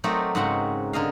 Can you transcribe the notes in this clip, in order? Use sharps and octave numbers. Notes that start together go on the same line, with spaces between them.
F#3 A3 C4 D#4 A#4 D5
G#2 C#3 C4 F#4 F#5
D3 A#4 D#5 F5